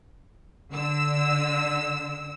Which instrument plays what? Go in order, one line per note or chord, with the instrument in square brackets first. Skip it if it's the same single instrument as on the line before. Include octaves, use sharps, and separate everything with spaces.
[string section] D3 E6